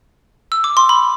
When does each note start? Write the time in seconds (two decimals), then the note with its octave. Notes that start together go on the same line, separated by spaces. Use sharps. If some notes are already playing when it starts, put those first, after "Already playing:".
0.52 E6
0.64 D6
0.77 C6
0.89 B5